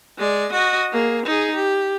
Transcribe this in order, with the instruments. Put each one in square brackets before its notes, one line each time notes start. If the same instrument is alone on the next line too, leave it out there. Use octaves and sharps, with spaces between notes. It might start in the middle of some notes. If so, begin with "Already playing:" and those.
[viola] G#3 D5
F#4 D#5
A#3 G#4
D#4 G#4
G4